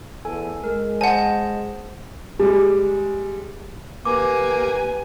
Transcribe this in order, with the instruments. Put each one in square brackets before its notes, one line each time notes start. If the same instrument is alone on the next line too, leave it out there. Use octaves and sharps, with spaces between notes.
[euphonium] E2 [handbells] A4 G#5
[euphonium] G#3 [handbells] A#4
[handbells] C5 D#5 A5 [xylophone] F#5 G#5
[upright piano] G3 G#3
[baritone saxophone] A#3 [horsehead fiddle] G4 G#5 [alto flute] B4 [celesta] D6